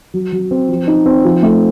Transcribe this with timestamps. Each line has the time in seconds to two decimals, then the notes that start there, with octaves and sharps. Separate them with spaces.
0.14 F#3
0.32 F#3
0.51 C4
0.69 F3
0.87 D#4
1.06 C4
1.25 F3
1.43 A3